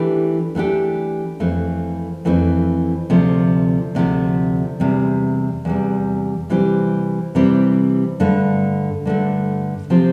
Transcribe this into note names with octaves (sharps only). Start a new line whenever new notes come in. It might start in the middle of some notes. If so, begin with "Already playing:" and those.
Already playing: E3 A3 D4 G4
E3 A3 D4 G4
F2 E3 A3 C4
F2 E3 A3 C4
D2 C3 F3 A3
D2 C3 F3 A3
E2 C3 G3
E2 C3 G3
C3 E3 G3 C4 G4
C3 E3 G3 C4 G4
G2 D3 A3
G2 D3 A3
C3 F3 C4 G4